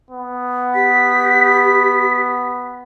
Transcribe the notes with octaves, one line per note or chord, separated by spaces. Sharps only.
B3
G4 B6